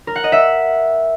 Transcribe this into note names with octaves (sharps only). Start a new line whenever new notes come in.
A#4
F#5
D#5
E5